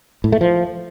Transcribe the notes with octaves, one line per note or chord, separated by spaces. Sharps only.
A2
A3
F3